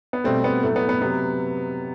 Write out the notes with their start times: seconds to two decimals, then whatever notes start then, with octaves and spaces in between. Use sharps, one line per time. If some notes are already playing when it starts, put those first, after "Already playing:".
0.13 B3
0.24 B2 G3 A3 C4
0.44 B3
0.63 A2 F#3 A3
0.76 B3
0.89 B3
1.02 C3 F#3 B3